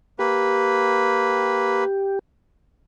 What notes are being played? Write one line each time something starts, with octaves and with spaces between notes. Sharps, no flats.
A#3 G4 B4